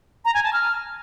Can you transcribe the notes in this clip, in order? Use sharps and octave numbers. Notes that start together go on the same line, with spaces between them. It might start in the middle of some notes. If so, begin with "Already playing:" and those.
A#5
G#5
A5
F6